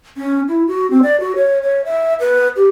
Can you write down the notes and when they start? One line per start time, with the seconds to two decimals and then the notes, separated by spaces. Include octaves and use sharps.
0.17 C#4
0.48 E4
0.67 F#4
0.91 C4
1.03 D5
1.20 F#4
1.36 C#5
1.63 C#5
1.85 E5
2.20 B4
2.56 G4